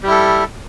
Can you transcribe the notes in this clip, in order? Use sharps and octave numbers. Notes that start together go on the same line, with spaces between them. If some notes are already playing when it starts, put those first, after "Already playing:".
G3 E4 A4